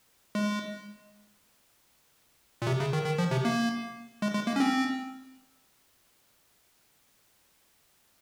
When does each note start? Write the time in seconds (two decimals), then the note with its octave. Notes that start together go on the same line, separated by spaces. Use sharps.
0.35 G#3
2.62 A#2
2.67 C3
2.80 C#3
2.93 D#3
3.06 D#3
3.18 F3
3.31 C3
3.45 A#3
4.22 G#3
4.35 G#3
4.47 A#3
4.56 C#4
4.60 C4